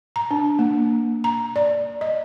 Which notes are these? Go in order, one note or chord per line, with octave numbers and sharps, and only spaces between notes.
A#5
D4
A#3
A#5
D5
D#5